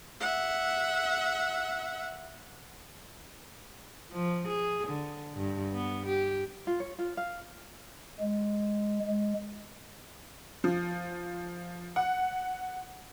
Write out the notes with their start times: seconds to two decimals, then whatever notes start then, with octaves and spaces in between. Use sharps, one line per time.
0.21 E5 F#5
4.12 F3
4.48 G#4
4.87 D3
5.36 G2
5.74 B3
6.06 G4
6.67 F4
6.80 C#5
6.99 F4
7.17 F5
8.20 G#3
9.08 G#3
10.64 F3
11.96 F#5